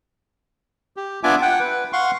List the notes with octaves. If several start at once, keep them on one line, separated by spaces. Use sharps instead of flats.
G4
B3 D4 F4 E5 G#5 D6
F#5 G5
B4
F5 F#5 C6 C#6